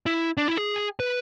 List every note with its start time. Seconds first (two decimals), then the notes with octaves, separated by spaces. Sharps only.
0.06 E4
0.37 D4
0.48 E4
0.57 G#4
1.00 B4